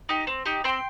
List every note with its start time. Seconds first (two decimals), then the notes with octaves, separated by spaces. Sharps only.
0.09 D#4 G4
0.27 C4
0.46 D#4 G4
0.64 C4 G5 C6